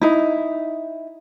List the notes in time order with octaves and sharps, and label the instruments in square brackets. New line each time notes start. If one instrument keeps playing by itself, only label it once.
[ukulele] D#4 E4